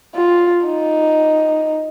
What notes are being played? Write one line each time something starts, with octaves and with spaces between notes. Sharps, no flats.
F4
D#4